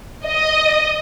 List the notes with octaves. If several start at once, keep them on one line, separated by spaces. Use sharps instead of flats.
D#5